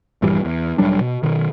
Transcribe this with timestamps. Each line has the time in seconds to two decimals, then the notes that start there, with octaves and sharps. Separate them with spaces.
0.22 A#1 G2 E3 G3
0.45 E2
0.78 E1 F#3 G3 D4
1.01 B2
1.23 B2 D#3